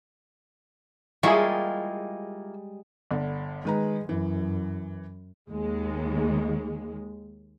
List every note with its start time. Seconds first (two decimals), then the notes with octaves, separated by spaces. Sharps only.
1.23 G3 G#3 A#3 E4 F4 G#4 C#6
3.11 G1 D3
3.65 D#3 G#3 B4 A#5
4.09 F#2 E3
5.50 D#2 G#3